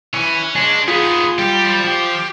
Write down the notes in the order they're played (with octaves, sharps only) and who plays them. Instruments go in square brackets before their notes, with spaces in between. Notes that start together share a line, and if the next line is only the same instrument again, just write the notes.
[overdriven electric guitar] E3 [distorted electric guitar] C#4 G#5
[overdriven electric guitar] G#3 C#4 [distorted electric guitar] D4
[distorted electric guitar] D#3 B3 [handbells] F4 [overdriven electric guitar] G#4
[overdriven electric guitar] G3 [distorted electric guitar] G4
[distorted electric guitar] F3
[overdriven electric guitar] G4